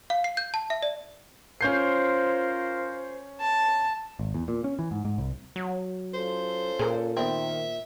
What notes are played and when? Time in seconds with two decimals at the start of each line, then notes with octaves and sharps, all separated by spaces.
0.10 F5
0.24 C7
0.37 G6
0.54 A5
0.70 E5
0.82 D5
1.61 C#4 F4 A#4 C5 G6 C7
3.40 A5
4.19 G#1
4.34 E2
4.48 A#2
4.64 C#4
4.79 E3
4.91 G#2
5.05 G#2
5.18 C2
5.56 F#3
6.14 C#4 F4 A4 C5
6.79 A#2 G#4 A#4
7.17 D#3 B3 C4 E5